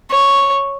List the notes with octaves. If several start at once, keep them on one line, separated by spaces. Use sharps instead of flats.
C#5